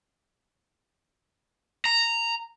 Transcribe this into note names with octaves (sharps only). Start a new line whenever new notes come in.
A#5